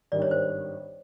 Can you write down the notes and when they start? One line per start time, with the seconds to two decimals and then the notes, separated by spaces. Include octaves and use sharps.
0.12 G#1 G2 D#3 G3 D5
0.22 C#5
0.31 C5